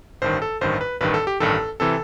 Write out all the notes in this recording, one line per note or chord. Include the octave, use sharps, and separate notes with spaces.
A1 G2 D#3 C5
A4
A1 G2 D#3 C5
B4
A1 G2 D#3 B4
A4
G4
A1 G2 D#3 A4
C3 E3 A4